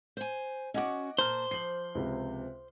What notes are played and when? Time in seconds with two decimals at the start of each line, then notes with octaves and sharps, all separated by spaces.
0.17 C5 G#5
0.74 C#4 F#4 D#5 F#5 D6
1.18 A#2 C5 A5 A#5 F6
1.51 F3 C7 F#7
1.95 C#2 C3